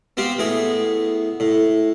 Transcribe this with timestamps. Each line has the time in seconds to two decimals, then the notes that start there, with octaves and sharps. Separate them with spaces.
0.17 B3 C4 G4 F5
0.39 A2 B3 G#4
1.40 A2